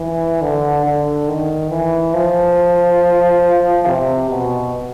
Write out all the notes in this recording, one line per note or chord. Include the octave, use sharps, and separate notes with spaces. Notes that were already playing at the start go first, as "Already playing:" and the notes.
Already playing: E3
D3
D3
D#3
E3
F3
C3
B2